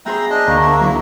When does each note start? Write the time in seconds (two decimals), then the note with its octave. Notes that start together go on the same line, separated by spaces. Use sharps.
0.06 B3 G#4 C5 E5 G5 A#5
0.30 D4 D#5
0.47 D2 A#3 B3 F5 C#6
0.62 E5
0.80 F#3 E4